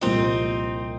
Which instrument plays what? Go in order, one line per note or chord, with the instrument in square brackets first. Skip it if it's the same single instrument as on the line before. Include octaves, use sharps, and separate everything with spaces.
[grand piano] C2 A#2 F3 A#3 F4 [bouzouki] C4 D#4